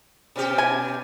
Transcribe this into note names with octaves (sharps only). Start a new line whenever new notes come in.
B2 C#4 G4
G#5